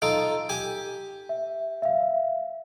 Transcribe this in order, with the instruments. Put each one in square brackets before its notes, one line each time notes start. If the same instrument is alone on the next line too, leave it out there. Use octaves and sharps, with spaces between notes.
[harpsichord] D#4 F4 A4 [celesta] D7
[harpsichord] G4 G#5
[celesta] E5
E5 F5